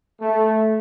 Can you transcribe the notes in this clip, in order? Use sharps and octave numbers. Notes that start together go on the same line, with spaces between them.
A3